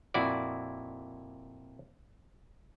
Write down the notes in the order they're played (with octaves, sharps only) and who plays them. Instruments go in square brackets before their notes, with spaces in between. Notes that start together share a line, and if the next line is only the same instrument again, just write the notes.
[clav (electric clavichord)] F2 A#2 E4 F#4 D5